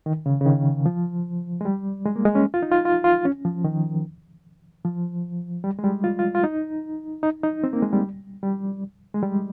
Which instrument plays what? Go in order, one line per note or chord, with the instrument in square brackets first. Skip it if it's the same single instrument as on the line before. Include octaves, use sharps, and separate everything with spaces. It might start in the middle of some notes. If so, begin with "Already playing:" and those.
[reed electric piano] D#3
C#3
C#3
D#3
F3
G#3
G3
G#3
A#3
G#3
C#4
F4
D#4
F4
F4
F4
C#4
F3
D#3
F3
G3
G#3
G3
F4
F4
F4
D#4
D#4
D#4
C4
A#3
G#3
G3
G3
G#3
G3